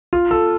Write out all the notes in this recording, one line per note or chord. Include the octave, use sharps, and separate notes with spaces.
F4
A4